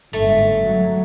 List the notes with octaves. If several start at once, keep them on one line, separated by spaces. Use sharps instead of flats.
G1 G#2 A3
F#3